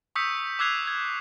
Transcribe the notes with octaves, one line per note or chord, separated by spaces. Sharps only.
C#6 D#6 E6 G6 B6 C#7
D6 E6 F#6 G#6 C7 F7
G#6